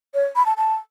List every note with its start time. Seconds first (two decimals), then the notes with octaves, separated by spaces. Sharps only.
0.14 C#5
0.36 B5
0.46 A5
0.57 A5